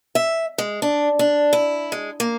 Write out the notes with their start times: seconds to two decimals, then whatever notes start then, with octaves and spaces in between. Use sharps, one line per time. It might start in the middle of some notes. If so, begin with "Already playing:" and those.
0.15 E5
0.58 G#3
0.82 D4
1.19 D4
1.53 E4
1.92 G#3
2.20 A#3